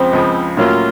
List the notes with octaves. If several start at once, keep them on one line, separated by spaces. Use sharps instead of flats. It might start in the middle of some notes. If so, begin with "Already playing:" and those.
Already playing: C#2 C#3 F3 C4
C#2 C#3 F3
A2 F#3 A#3 C#4 F4